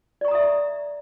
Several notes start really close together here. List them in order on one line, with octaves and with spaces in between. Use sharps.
D5 C#6 A#5 D#6 E5